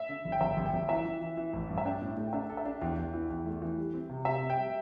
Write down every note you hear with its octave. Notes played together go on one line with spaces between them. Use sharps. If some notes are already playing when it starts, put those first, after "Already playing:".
Already playing: E5
D3
G1
G5
G1 E5
G1
G5
G1
E3 E5
E3
E3
E3
A1
G2
E5
D4 G5
A2
A3
G5
D4 E5
A4
E5
D4
E2 G5
E2
E3
E2
A3
E3
G3
C4
C3
C3 E5
C4
G5
G3